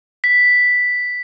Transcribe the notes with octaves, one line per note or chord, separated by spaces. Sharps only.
B6